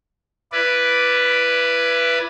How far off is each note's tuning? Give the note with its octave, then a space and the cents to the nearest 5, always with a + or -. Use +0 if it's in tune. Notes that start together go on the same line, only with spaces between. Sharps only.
E4 +30 B4 +0 D5 +0